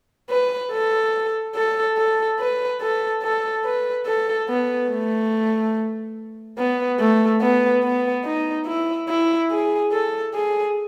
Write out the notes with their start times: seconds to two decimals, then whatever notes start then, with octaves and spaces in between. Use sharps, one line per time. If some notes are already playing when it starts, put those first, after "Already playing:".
0.30 B4
0.72 A4
1.55 A4
1.97 A4
2.40 B4
2.81 A4
3.23 A4
3.65 B4
4.06 A4
4.49 B3
4.90 A3
6.58 B3
6.99 A3
7.41 B3
7.83 B3
8.25 D#4
8.66 E4
9.08 E4
9.51 G#4
9.92 A4
10.34 G#4